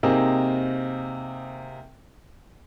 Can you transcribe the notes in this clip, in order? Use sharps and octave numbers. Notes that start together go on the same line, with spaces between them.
C3 A#3 C4 D#4 G#4